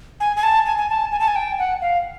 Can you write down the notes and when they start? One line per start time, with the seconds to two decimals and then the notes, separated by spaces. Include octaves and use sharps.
0.20 G#5
0.37 G#5
0.43 A5
0.66 G#5
0.78 G#5
0.89 A5
1.12 G#5
1.20 A5
1.28 G#5
1.36 G5
1.59 F#5
1.81 F5